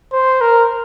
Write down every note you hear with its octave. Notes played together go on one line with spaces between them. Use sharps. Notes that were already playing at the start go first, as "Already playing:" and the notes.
C5
A#4